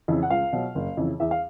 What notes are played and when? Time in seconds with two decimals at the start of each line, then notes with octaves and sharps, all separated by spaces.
0.08 F2 C#3 E3
0.23 F#5
0.30 C#2 F5
0.53 B2 F#3
0.75 F#1
0.97 F2 C#3 E3
1.20 E2 E5
1.31 F5